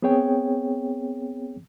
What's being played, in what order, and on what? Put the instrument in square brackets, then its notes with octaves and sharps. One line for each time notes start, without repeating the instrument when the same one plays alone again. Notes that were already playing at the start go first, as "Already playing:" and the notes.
[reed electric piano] B3 C4 G#4 C#5 G5